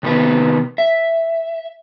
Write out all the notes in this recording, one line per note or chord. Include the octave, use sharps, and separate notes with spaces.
C3 D#3 B3 B4
E5